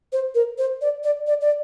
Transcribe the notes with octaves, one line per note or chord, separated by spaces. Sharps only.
C5
A#4
C5
D5
D5
D5
D5